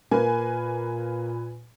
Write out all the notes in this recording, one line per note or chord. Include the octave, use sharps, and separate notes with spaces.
A#2 A#3 B4 G#5